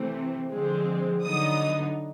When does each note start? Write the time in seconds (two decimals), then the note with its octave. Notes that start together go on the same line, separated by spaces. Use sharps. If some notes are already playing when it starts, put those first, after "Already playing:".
Already playing: C3 E3 A3 C4
0.51 D3 F3 G#3 C4
1.23 D3 F#3 B3 D#4 D#6